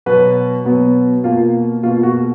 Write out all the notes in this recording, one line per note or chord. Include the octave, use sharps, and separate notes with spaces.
B2 F#3 B3 B4
B2 F#3 B3
B2 A#3 F4
B2 A#3 F4
F#4